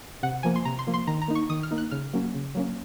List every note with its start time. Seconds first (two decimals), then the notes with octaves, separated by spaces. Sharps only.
0.23 C3 F#5
0.43 F3 A#3 G#5
0.56 C6
0.65 C3 A#5
0.79 C6
0.87 F3 A#3
0.94 C6
1.07 D#3 A#5
1.22 A#5
1.28 A#3 D#4
1.35 C#6
1.50 D#3 D#6
1.63 F6
1.71 A#3 D#4
1.78 F#6
1.91 C#3 F6
2.13 F#3 A#3 C#4
2.34 C#3
2.55 F#3 A#3 C#4